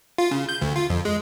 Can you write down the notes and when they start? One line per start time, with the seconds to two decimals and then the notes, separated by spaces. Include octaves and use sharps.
0.18 F4
0.31 C#3
0.49 G6
0.62 D2
0.76 F4
0.90 F2
1.05 G#3